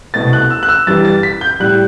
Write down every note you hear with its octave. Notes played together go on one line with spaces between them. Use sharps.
C2 B2 A3 A6
F#6
E6
F#6
E6
G2 E3 G3 A6
A6
B6
G6
A2 G3 F#6